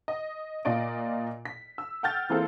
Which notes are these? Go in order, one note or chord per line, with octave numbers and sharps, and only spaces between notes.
D#5
A#2 F4 D5 D#5 D7
B6
E6
F#5 G5 F6 G6 A6
E3 A#3 C4 F4 G#4 A4